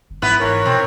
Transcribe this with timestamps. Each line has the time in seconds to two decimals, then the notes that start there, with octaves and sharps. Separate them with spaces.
0.10 G1
0.22 G#2 B3 E4 B4
0.40 E3 A#4 C#5
0.66 B2 C4